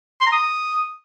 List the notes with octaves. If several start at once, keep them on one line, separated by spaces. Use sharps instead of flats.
C6
A#5
D#6